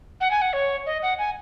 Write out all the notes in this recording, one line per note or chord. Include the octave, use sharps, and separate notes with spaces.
F#5
G#5
F#5
C#5
D#5
F#5
G#5